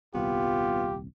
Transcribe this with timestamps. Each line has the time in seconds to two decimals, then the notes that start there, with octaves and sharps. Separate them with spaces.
0.14 D#1 C2 B3 F4 G4